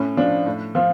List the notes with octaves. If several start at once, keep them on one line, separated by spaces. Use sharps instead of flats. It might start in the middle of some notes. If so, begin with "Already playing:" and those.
Already playing: A2 C#4
F3 D4
A2
F3 F4